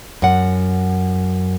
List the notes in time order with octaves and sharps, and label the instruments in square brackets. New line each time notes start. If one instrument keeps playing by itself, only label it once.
[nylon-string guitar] F#2 F#5